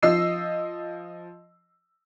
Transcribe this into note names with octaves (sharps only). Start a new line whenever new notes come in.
F3 D#5 E6 C7